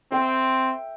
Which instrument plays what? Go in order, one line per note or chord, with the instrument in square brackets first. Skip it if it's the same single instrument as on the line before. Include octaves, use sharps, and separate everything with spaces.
[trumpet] C4 [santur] E5 G5